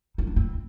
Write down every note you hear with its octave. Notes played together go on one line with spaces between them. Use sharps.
D#4
D4
C4